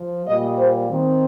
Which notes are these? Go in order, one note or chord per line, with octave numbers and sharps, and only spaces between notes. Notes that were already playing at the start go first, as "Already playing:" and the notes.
Already playing: F3
A#2 G3 A#3 D#5
C5
D#3 C4